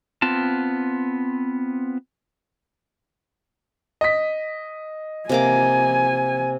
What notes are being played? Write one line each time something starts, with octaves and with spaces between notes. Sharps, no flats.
B3 C4 F4 A5
D#5 B6
C3 A#3 G#5 D6